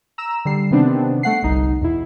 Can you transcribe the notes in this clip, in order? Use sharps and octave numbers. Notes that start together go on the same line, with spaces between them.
A#5 E6 E7
D3 G3 C7
C3 D#3 B3 C4 D4
A3 F#5 C7
G1 C2 D#4
E2 B2 E4